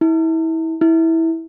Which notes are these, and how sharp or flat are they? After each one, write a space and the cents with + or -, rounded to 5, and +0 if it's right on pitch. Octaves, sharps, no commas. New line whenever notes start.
E4 -30
E4 -15